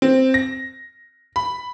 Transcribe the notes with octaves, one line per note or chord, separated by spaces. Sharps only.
C4
A#6
B5